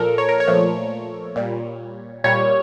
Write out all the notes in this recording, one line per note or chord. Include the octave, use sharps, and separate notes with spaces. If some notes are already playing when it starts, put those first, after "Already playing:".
Already playing: A#2 F3 A4 A#4
C#5
A#4
C#5
A#2 F3 A3
A#2 G3
A#2 G3 C#5